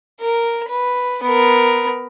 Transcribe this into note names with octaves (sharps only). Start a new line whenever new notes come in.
A#4
B4
B3 A#4